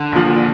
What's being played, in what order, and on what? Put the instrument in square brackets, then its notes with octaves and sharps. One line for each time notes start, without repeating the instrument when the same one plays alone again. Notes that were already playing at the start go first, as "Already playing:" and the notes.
Already playing: [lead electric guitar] D3
[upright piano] A#1 A#2 F3